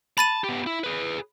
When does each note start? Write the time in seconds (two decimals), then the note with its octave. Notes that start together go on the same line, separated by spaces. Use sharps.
0.18 A5 B5 A6 D#7
0.44 B3 G4
0.67 E4
0.84 G#4 B4